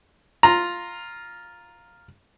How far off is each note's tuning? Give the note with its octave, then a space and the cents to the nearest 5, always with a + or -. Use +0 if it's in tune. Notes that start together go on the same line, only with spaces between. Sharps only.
F4 +0 A#5 +0